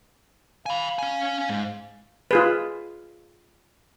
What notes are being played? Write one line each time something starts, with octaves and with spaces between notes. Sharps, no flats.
F5 G#5 B5
C#4 G#5
G#2
F4 G#4 B4